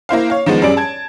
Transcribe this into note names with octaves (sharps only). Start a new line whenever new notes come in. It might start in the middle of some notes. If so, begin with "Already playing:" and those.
A#3 E4 C5 F5
C#5 F5
D#3 F3 G#3 B3
F#2 G3 G#4 D5 D7
A5 G#6